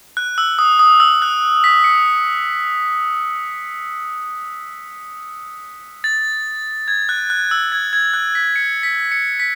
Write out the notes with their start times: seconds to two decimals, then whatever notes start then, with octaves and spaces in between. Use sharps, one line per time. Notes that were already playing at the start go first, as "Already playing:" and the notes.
0.17 F#6
0.38 E6
0.59 D#6
0.79 D#6
1.00 E6
1.22 F#6
1.64 B6
1.84 C#7
6.04 A6
6.88 G#6
7.09 F#6
7.30 F#6
7.51 E6
7.72 G#6
7.93 G#6
8.14 F#6
8.35 B6
8.56 C#7
8.83 B6
9.12 C#7
9.40 B6